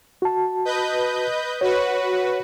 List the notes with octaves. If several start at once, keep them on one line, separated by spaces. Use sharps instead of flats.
F#4 A5
B4 D#5 G6
F#4 B4 C#5